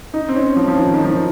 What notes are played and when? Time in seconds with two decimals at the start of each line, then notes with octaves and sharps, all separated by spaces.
0.14 D#4
0.29 C4
0.35 C#4
0.56 F3
0.68 F3
0.78 D#3
0.94 D#3
1.05 F3
1.10 D#3